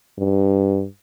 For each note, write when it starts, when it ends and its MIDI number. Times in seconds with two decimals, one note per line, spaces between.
0.18 0.85 43